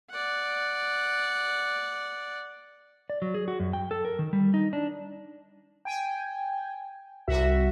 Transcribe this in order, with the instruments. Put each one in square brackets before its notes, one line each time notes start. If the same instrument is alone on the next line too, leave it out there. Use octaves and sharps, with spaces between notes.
[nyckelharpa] D5 F#5
[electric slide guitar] D5
F#3
G#4
F#4
F#2
G5
A4
A#4
D#3
G3
D#4
D4
[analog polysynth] G5 G#5
C2 F#4 E5